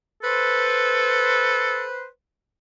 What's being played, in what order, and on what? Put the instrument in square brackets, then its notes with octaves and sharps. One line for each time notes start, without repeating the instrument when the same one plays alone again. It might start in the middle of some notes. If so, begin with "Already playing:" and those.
[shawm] A4 [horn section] B4 C5